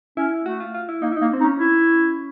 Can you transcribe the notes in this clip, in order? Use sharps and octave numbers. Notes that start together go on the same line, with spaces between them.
C#4 E4
A3 F#4
F4
F4
E4
A#3 D#4
E4
A#3 D#4
C4
D#4
C#4
E4